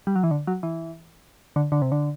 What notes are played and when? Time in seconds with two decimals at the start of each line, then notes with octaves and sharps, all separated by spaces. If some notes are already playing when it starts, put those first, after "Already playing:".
0.07 G3
0.16 F#3
0.23 E3
0.31 D3
0.47 F#3
0.63 E3
1.56 D3
1.72 D3
1.82 C3
1.92 D3